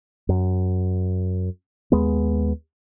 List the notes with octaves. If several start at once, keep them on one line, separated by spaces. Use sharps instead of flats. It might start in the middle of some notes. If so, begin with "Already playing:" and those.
F#2
D#2 G#3 B3